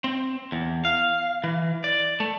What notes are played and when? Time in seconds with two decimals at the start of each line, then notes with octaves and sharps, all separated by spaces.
0.04 C4
0.52 E2
0.85 F5
1.44 E3
1.84 D5
2.20 A3